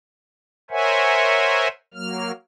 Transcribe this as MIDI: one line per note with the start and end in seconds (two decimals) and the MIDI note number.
0.70 1.68 70
0.70 1.68 72
0.70 1.68 73
0.70 1.68 76
0.70 1.68 78
0.70 1.68 80
1.94 2.32 54
1.94 2.32 58
1.94 2.32 89